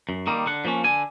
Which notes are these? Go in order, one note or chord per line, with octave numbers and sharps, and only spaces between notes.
F#2
D#3 G3 A#3
D3 F#5
F3 A#3 C#4
D3 G#5